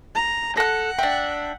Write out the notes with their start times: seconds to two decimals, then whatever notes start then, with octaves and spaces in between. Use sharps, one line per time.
0.15 A#5
0.57 A4 F#5 F#6 A#6
0.99 D4 E5 G5